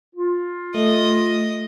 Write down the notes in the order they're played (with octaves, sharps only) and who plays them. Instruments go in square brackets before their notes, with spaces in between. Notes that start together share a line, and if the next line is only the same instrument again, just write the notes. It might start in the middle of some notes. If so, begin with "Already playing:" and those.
[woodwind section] F4
[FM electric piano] A3 [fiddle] D#5